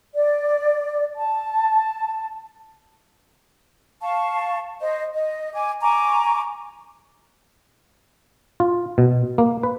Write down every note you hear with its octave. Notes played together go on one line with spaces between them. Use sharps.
D5
A5
F5 A5 C#6
C5 D#5
D#5
G#5 D6
G#5 A#5 C#6 D6
F4
B2
A#3
B4